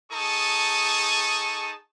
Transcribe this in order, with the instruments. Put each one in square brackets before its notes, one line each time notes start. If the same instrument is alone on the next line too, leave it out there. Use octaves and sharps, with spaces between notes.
[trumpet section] D#4 G#4 A4 A5 C#6 D#6